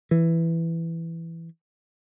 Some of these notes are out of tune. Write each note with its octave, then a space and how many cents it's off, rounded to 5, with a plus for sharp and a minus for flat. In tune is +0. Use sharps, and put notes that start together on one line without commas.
E3 +5